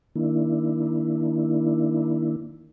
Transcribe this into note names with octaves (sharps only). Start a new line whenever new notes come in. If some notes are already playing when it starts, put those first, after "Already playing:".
D#3 A#3 D4 E4